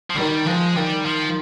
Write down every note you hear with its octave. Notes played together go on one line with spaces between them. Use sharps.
F3
D#3 G3
F3 G#3
D#3 G3
F3